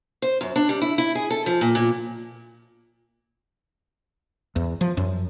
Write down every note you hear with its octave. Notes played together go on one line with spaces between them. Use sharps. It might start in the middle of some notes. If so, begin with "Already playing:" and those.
C5
F#2
D4
G3
E4
E4
G#4
A4
F3
A#2
A#2
E2
F3
F#2